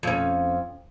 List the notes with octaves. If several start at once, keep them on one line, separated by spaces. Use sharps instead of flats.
F2 C#4